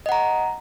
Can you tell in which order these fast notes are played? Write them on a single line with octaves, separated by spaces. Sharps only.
D#5 F#5 A#5